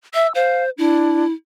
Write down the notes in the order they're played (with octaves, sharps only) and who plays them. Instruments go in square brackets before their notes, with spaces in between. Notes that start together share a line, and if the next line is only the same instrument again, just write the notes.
[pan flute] E5 [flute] E6
[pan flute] C5 [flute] F5
[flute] D4 [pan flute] E4